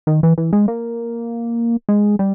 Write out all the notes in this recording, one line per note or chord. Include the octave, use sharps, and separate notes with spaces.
D#3
E3
E3
G#3
A#3
G#3
G3